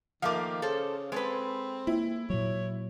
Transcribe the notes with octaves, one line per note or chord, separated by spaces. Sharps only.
D#3 F3 A3 A#3 F5 D6
C#3 A4 C5
G#3 C4 A4 B4
A#3 E4
A#2 F#3 C#5